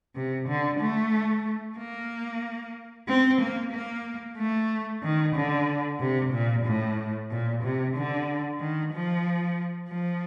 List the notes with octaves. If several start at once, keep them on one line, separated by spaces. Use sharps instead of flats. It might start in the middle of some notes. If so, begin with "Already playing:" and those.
C3
D3
A3
A#3
C4
A#3
A#3
A3
D#3
D3
C3
A#2
A2
A#2
C3
D3
D#3
F3
F3